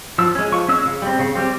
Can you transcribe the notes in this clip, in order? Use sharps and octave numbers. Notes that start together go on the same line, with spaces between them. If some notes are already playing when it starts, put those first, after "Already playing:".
F3 E6
G#3 C#4
F3 C#6
G#3 C#4 E6
C#3
G3 C4
C#3
G3 C4